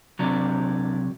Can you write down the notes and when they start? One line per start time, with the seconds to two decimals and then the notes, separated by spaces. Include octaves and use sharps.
0.19 C2 C3 F#3 D4